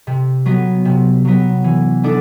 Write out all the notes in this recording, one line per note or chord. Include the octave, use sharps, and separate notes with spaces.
C3
F#3 B3
C3
F#3 B3
E3
B3 D4 A4 D5